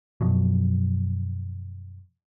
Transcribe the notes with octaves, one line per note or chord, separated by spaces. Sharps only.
F#2 B2 F3 F#3